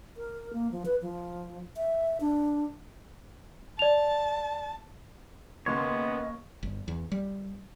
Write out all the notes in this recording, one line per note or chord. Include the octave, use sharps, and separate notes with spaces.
A#4
A#3
F3
B4
F3
E5
D4
D5 A5 F7
D#2 C#3 A#3 B3 C#5 D#5 C6
G1
E2
G3